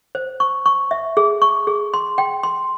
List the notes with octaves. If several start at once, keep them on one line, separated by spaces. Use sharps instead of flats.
C5
C#6
C#6
E5
G#4
C#6
G#4
C6
G5
C6